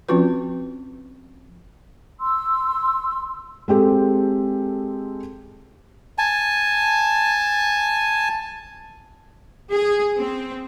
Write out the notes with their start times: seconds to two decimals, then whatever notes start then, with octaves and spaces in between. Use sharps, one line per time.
0.09 F3 C4 C#4 F4 F#4 B4
2.20 C6 E6
3.68 G#3 C4 G4 A4
6.18 G#5 A5
9.70 G#4
10.18 C4